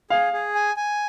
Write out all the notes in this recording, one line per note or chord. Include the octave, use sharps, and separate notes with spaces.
G#4 F5
G#4
G#5
G#5